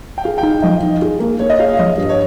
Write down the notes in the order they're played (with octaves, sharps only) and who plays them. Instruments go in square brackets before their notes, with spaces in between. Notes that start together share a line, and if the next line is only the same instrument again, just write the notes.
[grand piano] G5
[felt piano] G#4 [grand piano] F5
[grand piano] G5
[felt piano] D#4
[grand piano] F5
[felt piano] F3 [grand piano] D#5
[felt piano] D#4
G#4
A#3
[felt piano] A#3 [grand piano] C#5
[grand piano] D#5
[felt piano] G#4 [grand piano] F5
[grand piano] F5
[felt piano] F3 [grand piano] D#5
[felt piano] G2
[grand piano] C#5